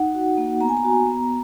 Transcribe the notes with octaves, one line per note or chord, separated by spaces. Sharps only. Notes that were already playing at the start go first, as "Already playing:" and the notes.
Already playing: D#4 F#5
F#4
A#3
B3 A#5
G#5
A#5
F#4
B3